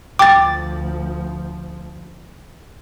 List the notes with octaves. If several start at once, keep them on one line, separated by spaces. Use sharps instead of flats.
D2 F3 G5 D6 A6